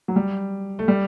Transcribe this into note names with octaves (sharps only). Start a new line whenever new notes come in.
F#3
G3
A3
G3